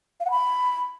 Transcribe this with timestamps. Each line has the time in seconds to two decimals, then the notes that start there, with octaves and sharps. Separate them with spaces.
0.20 F5
0.25 F#5
0.31 B5